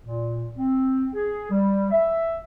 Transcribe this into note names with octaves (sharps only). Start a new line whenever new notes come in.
A#2
C4
G#4
G3
E5